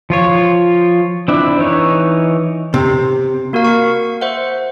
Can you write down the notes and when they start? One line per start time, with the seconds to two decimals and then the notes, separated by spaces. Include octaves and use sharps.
0.10 F3 F4 C#5
1.28 C4 D4 E4
1.59 E3 D#4 C#5
2.74 C3
3.53 A#3 F#4 A#4 F5
3.64 C#6
4.21 C5 E5 F#5